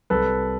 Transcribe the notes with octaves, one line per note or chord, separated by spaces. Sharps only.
C2 A4 B4